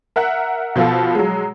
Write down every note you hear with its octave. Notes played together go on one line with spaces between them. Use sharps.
A#4 E5 F#5 F#6
B2 F3 B3 F4 A4
F#3 G#3